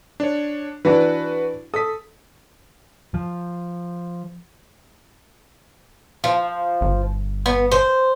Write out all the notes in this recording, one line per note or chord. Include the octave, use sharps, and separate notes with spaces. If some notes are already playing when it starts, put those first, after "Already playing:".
D4 C#5
E3 D4 F#4 B4
A4 D#6 B6
F3
F3
G1
B3
C5